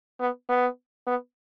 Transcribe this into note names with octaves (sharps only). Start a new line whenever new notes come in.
B3
B3
B3